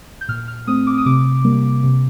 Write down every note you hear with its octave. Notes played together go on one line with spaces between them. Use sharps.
G6
A#2 F6
F6
A3 C4 D#6
D6
D#6
C3 D6
G3 A#3
C3